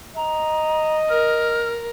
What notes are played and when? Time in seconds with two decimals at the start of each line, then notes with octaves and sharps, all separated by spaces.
0.16 D#5 A#5
1.09 A#4 F6